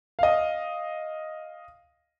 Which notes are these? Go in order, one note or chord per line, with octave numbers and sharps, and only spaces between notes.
D#5 F5